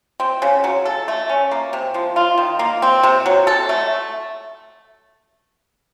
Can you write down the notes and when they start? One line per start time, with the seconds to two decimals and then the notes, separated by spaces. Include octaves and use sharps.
0.20 C4
0.42 C#3
0.64 F#3
0.85 A4
1.08 A3
1.29 C#4
1.51 A#3
1.73 C3
1.94 F3
2.16 F4
2.38 D#3
2.59 A#3
2.82 C4
3.03 C3
3.26 F#3
3.47 A4
3.69 A3